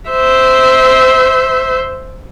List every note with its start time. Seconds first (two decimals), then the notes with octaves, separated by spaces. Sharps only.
0.10 C5 E5